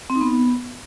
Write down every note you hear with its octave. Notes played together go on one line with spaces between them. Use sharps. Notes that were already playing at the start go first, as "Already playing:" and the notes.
C4
D#4
B3